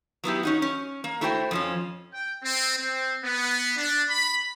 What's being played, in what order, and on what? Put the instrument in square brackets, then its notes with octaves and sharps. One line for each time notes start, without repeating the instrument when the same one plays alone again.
[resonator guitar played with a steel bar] F#3 B3 E4 G4
C#4 D#4 F#4
C#4
A#3
A3 E4 F#4 C5 F#5 G5
F2 F3 C#4
[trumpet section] G5
C4
C4
B3
D4
B5